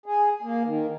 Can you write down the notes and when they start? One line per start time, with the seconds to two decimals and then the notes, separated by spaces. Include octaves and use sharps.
0.06 G#4
0.42 A#3
0.65 D#3